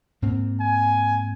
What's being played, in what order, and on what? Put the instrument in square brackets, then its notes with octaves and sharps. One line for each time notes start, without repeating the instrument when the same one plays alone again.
[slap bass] G#2 A#3 C4
[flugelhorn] G#5